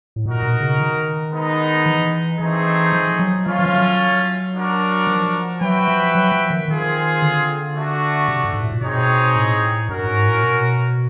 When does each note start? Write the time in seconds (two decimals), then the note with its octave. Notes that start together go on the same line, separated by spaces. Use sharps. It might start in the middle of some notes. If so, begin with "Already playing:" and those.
0.16 A2
0.25 A#2 D#4 F#4 A#4
0.43 B2
0.61 C#3
0.79 D#3
1.32 G#3 B3 D#4
1.86 E3
2.39 E3 A3 C4 D#4 G#4
2.93 F3
3.19 F#3
3.46 F3 A3 C#4 F4
3.59 E3
3.66 F3
3.74 F#3
4.54 D4 F#4 A#4
5.07 F3
5.61 F#3 F#4 B4 E5 G5
5.88 F3
6.15 F#3
6.32 F3
6.50 D#3
6.68 D#3 C4 F4 G#4
7.22 D3
7.75 A3 D4 F#4
8.28 C3
8.44 G2
8.54 G#2
8.63 A2
8.72 A#2
8.82 B2 C4 D#4 G#4 C#5
9.36 A2
9.89 G2 C#4 F#4 A#4
10.07 G#2
10.25 A2
10.43 B2